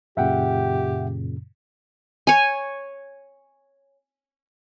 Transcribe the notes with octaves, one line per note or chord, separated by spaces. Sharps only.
F#2 A#2 C#3 G4 E5 F#5 G5
C#5 G#5